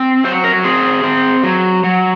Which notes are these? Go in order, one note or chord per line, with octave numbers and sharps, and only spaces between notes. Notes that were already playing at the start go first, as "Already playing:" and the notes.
Already playing: C4
F#3 C5
A#4
C4 G#4
C4
F#3
F#3